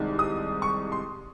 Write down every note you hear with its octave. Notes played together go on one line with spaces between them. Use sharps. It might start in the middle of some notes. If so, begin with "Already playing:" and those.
Already playing: C2 C3 D#3 G#3
D#6
C#6
C6